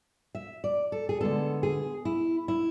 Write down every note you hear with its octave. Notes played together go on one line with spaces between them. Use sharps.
E5
D5
A4
G#4
D3 G#3 B3 A4
G#4
E4
E4